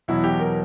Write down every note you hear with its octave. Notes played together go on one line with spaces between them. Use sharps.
E2 B2 F#3 E4
G4
A#4